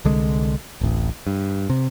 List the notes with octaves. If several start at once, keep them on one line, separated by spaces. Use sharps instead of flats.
C2 D3 G#3
D1 A1
G2
C3